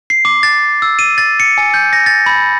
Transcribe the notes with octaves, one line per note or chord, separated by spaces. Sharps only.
C7
D6
A6
E6
D#7
A6
C#7
G#5
G6
A#6
A6
B5